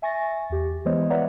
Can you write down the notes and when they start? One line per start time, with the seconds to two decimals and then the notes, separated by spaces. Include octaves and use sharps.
0.02 E5 G#5 C#6 A6 A#6
0.50 E2 G4
0.85 E3 G#3 B3 C5 C#5 D#5
1.10 B4 C#5 D5 E5 F#5 A#5